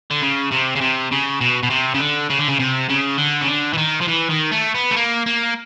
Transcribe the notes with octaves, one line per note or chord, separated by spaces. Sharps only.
D3
C#3
C3
C#3
C3
C#3
B2
B2
C3
C#3
D3
C#3
D3
C#3
C3
C#3
D3
C#3
D3
E3
D#3
F3
E3
D#3
A3
B3
A3
A#3
A#3